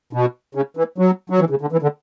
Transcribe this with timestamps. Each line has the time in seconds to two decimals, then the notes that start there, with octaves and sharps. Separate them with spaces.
0.13 B2
0.55 C#3
0.77 E3
0.98 F#3
1.30 F#3
1.40 E3
1.50 C#3
1.61 D3
1.72 E3
1.82 D3